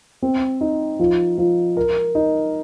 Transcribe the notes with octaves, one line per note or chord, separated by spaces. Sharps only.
C4
D#4
F3
F3
A#4
D#4